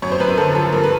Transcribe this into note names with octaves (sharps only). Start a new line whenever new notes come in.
F#2 C#5
C5
F#2 B4
A#4
D3 A4
F3 A4
G2 A#4
B4